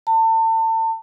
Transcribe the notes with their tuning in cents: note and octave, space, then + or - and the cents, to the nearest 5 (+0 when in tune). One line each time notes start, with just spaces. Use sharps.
A5 +35